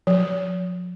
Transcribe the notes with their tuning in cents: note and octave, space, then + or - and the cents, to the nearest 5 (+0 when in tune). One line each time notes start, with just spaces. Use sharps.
F3 +40